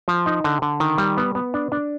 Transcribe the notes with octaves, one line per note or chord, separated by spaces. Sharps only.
F3
D#4
D3
D3
D#3
G3
B3
B3
D4
D4